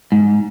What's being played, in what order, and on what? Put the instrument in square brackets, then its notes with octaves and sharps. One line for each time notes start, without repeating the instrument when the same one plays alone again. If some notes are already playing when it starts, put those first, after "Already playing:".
[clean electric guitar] G#2